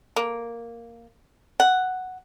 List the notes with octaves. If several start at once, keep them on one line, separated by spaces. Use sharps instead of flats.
A#3
F#5